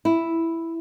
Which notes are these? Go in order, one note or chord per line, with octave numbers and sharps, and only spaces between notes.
E4